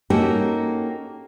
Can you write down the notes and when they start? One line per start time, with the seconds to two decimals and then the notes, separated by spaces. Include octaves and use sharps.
0.10 A#3 C#4 D#4 F#4 G4 A4